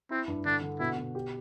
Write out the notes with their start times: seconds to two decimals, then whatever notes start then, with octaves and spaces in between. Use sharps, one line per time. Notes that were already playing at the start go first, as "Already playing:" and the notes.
0.10 C4 E4
0.28 G2
0.45 D3 D4
0.62 D3
0.80 B2 E4
0.98 B2
1.15 G4